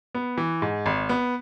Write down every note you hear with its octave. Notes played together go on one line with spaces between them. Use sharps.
B3
E3
G#2
G#1
B3